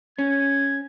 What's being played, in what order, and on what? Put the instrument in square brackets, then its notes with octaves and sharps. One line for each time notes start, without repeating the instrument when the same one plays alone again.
[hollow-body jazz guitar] C#4 [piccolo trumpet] G#6